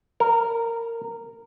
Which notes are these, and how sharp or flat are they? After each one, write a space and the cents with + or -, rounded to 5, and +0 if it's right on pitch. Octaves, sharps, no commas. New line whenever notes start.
A#4 -15